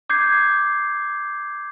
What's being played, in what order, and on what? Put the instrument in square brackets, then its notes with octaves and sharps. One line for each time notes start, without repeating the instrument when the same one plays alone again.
[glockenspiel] D6 G6 G#6 C7